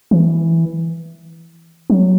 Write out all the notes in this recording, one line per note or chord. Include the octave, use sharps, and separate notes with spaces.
E3
F#3